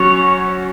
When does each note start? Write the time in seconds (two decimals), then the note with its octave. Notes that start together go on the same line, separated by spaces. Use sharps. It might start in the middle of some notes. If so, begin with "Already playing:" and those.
Already playing: F#3 C#4 F#4 C#5